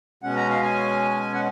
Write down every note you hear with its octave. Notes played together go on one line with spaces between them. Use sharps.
B2 G#3 C#4 F#5
A#5
F5
G#5
F#5